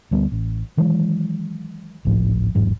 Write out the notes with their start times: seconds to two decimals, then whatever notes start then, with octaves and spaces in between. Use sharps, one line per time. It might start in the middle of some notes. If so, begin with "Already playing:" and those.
0.11 D2 G3 B3
0.32 A1
0.77 D#3 E3 F#3 G#3
2.05 G#1 C#2 A2 F3
2.55 E1 A1 G#2 F#3